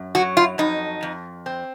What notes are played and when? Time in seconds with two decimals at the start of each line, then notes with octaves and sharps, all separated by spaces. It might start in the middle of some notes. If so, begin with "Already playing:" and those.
Already playing: F#2
0.15 F#3 F#4
0.37 F4
0.58 F2 D#4
1.03 F2
1.46 C4